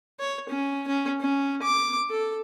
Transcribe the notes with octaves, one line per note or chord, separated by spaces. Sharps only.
C#5
C#4
C#4
C#4
D6
A4